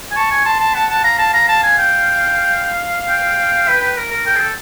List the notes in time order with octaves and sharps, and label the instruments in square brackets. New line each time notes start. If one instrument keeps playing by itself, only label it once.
[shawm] G#5
[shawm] A5 [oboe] C#6
[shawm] G#5
[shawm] A5 [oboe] C6
[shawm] A5
[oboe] F#5 [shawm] A5
[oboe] F#5 [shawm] A5
[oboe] F5 [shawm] A#5
[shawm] A5
[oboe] F5 [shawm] A#5
[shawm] A5
G#5
G5
G5
[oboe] B4
B4
A#4
A#4
[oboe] A#4 [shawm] G5
[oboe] G#4
A4